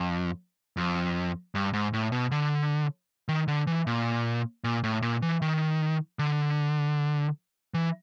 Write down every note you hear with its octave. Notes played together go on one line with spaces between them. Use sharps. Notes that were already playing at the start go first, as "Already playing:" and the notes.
Already playing: F2
F2
G2
G#2
A2
B2
D3
D#3
D3
E3
A#2
A#2
A2
A#2
E3
D#3
D3
E3